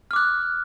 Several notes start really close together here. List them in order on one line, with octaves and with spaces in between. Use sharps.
F6 D6 F#6